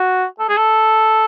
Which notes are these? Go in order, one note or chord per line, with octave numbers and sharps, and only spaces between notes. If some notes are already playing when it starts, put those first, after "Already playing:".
Already playing: F#4
A4
G#4
A4